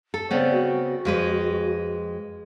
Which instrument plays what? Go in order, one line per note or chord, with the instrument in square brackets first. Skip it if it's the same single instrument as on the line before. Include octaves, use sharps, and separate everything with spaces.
[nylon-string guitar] A4
[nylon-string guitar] C#3 B3 C4 [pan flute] D5
[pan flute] F#4
[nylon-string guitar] F2 G#3 B4